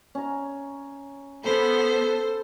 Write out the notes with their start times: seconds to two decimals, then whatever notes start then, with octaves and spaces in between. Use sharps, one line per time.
0.15 C#4 A#5
1.44 B3 A4 C5 B5